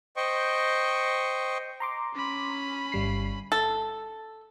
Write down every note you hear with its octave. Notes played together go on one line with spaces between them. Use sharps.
C5 D#5 G5 C#6
A#5 C6 D6
C#4 B5
G1 G3 C7
A4